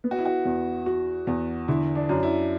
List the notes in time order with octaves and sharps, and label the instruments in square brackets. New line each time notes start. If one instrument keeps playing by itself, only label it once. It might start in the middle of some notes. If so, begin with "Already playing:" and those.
[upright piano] B3
[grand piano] F#4
E4
F#4
[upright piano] E2
F#4
E2
[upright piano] D3 [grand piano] E4
[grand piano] D4
[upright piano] F#2
[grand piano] E4